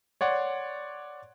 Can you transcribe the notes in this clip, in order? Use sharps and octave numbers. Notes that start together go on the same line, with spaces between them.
C#5 D5 F#5 C6